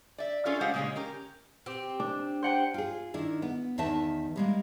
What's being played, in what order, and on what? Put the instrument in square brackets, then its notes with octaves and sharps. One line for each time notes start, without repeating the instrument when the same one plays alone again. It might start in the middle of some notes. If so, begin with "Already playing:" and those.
[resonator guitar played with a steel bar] D5 E5
C#4 F4 G#4 A4 C#5 F5
G#3 G4 C5 D5 F5 F#5
A#2 C#3 G#3 C#4 G#4
C#4 G4 A#4
[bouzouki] C4 G4
[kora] D4
[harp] C5 F#5 G5
[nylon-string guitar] F4 G#4
D#3 D4 E4
B3
E2 D#3 B4 E5 A5
G3 G#3 A#3